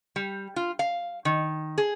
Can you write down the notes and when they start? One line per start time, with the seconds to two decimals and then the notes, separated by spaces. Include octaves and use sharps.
0.16 G3
0.56 F4
0.79 F5
1.25 D#3
1.78 G#4